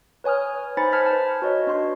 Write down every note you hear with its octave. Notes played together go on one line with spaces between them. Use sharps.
B4 C#5 G#5 D#6 F6
D#4 C5 G#5 B5 A6 C#7
C5 A5 F6 G#6 B6
B4 A5
F#4 B4 C#5 D#5
D4 F#4 C6